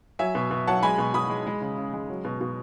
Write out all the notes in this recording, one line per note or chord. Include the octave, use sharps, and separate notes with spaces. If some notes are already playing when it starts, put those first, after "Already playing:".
F#3 E5 G#5
B2
B2
F#3 F#5 A5
G#3 G#5 B5
B2
B2 B5 D#6
G#3
G#3
C#3
C#3
G#3
F#3
B2
B2